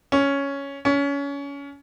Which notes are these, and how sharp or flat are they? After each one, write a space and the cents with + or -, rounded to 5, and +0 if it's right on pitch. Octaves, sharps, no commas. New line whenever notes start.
C#4 +5
C#4 +25